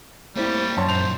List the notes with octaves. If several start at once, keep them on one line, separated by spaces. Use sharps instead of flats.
A2 G3 A#3 C4 E5
F#2 C#5 A5 C6
A#2 F#3 C5 F7